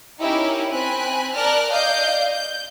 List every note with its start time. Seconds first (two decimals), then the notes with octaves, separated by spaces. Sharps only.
0.20 C#4 D#4 E4 G4 A#4
0.70 C4 G#5 B5 F#6
1.36 A#4 D5 A5 F6 F#6
1.71 D5 D#5 F5 G6
2.32 G6